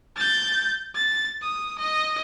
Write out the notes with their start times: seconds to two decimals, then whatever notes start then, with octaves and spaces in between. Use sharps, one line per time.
0.16 G6 A6
0.95 A6
1.42 D#6
1.79 D#5